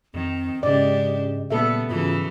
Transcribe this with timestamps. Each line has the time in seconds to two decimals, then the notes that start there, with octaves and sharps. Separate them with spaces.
0.14 F2 D#3 C4
0.63 G#2 C#3 G#3 D4 G4 D5 D#5
1.50 A#2 G3 A#3 B3 A4 E5
1.89 G#2 C#3 E3 F#3 F4